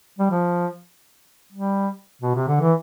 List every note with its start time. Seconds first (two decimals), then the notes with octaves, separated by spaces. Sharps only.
0.19 G3
0.31 F3
1.52 G3
2.22 B2
2.35 C3
2.48 D3
2.61 E3